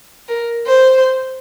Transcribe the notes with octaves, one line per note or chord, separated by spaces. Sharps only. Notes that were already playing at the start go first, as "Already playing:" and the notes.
A#4
C5